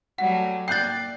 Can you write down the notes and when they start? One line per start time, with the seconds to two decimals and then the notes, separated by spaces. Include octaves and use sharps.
0.18 F#3 G3 A3 F#5
0.68 A#3 D5 G5 F#6 G6 A6 C7